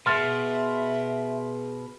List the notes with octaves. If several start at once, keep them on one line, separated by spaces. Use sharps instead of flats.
B2 G#4 E5 C6 F6 A6